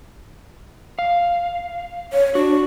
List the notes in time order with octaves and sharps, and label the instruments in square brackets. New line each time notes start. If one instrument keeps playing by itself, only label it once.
[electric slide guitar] F5
[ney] C#5
[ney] D4 [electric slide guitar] F#4